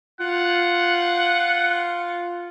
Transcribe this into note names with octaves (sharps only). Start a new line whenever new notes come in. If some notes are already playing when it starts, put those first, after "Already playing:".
F4 F#5